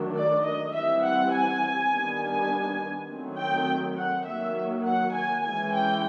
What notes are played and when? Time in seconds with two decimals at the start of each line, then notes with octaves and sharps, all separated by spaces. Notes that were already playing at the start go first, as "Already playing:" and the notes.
Already playing: D#3 F#3 A3 D4
0.14 D5
0.44 D#5
0.73 E3 G3 C4 E5
1.03 F#5
1.32 G#5
1.91 D#3 G3 B3 D4
2.20 G#5
3.09 D#3 F#3 A3 C4
3.39 G5
3.98 F#5
4.27 D#3 F#3 A#3 E5
4.86 F#5
5.15 G#5
5.45 E3 G#3 C#4 G#5
5.74 G5